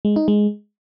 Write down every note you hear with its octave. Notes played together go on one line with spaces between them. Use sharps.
G#3
D#4
G#3